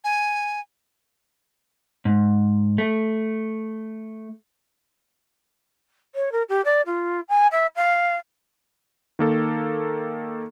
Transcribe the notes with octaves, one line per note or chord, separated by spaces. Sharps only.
G#5
G#2
A3
C#5
A#4
G4
D5
F4
G#5
E5
F5
D#3 A#3 A4